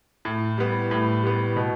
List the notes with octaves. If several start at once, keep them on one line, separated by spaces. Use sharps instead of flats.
A2
G3 B3
A2
G3 B3
B2